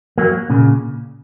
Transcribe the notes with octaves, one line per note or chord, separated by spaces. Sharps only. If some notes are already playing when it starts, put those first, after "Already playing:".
F#3 A#3
A#2 C#3